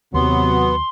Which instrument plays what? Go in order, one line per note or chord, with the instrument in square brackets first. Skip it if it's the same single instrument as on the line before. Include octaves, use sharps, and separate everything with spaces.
[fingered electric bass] D#2 D#3 [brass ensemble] C3 F#3 [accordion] B3 [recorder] C6